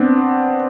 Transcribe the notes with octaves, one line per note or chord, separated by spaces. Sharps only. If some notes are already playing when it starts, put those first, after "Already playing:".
Already playing: B3 C4 D4